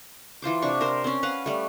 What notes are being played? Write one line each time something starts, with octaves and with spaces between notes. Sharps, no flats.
E3 F4 C5 D6
C3 D4 C#6
A#4 C5
C4 C#4
B4 F5 F#5
G3 A3